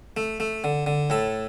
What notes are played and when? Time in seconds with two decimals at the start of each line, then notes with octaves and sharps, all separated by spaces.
0.17 A3
0.40 A3
0.64 D3
0.87 D3
1.10 A2 A4